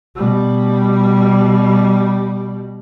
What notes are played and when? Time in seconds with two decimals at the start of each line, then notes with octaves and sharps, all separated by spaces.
0.15 B2 G3